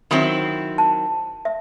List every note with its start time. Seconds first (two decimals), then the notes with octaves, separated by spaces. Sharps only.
0.11 D#3 F#3 C4 E4 B5
0.78 A5
1.45 E5